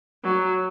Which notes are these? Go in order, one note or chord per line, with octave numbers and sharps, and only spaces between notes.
F#3